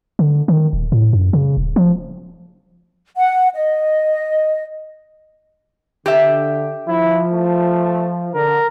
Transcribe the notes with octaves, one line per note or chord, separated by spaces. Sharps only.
D3
D#3
D#1
A2
F#2
C#3
D#1
F3
F#5
D#5
D3 G4 E5
F3 E4
A3
D3 A#4